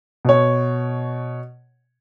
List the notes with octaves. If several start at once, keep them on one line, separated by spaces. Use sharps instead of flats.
B2 C#5